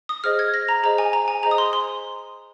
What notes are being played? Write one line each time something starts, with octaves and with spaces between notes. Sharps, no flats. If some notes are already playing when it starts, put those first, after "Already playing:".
D#6
G#4 C5 D#5 F6
G#6
A#6
A#5
G#4 C5 D#5 A#5
G#5
A#5
G#5
G#4 C5 D#5 A#5
D#6
C6
C6